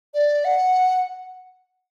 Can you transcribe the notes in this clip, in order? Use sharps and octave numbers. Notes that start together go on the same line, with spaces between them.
D5
F#5